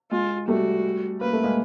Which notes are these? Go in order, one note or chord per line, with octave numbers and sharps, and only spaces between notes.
G#3 F4
G3 A3 F#4
A#3 B4
A3
G#3 A#3